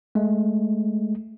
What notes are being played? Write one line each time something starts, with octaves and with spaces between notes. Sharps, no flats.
G#3 A3